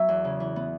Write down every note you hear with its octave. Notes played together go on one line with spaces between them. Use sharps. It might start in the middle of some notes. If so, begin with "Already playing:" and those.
Already playing: F#3 B3 E5
E2
C#3
E3
B3